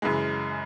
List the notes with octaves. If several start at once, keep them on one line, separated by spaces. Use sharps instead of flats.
F#2 C#3 E3 G#3